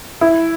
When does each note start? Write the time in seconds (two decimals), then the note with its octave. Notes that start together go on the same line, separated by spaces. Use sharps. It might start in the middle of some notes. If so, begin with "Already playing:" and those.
0.21 E4